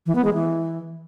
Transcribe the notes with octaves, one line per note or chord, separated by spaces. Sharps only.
E3
B3
G#3
E3